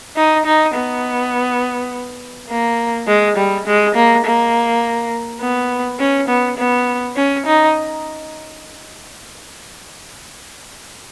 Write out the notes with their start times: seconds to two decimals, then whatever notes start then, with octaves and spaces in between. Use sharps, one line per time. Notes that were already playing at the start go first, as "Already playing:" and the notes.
0.16 D#4
0.46 D#4
0.74 B3
2.50 A#3
3.08 G#3
3.37 G3
3.67 G#3
3.95 A#3
4.25 A#3
5.41 B3
5.99 C#4
6.28 B3
6.58 B3
7.16 C#4
7.46 D#4